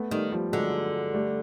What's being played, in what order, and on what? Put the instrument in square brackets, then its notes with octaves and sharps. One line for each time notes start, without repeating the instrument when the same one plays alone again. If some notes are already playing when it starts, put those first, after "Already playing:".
Already playing: [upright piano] A3 B3
[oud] D#3 [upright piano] G3 A3
[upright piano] F3 G3
[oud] D3 [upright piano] F#3 G#3
[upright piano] G3 A3